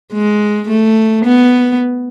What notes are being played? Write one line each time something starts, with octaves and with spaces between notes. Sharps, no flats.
G#3
A3
B3